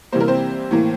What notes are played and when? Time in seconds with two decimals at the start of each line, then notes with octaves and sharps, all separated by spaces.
0.12 C3 E3 G3 A#3 C5
0.21 A#4
0.28 C4 C5
0.71 A2 E3 A#3